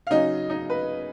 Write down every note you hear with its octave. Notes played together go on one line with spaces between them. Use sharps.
F5
C#3 F#3 C#4 D#4 D#5
D#4 D#5
B4